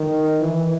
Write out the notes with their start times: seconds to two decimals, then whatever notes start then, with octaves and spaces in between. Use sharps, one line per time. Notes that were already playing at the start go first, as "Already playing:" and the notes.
Already playing: D#3
0.41 E3